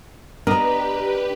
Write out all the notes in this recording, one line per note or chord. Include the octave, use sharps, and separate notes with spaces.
B3 D4 G4 A#4 B4 D#5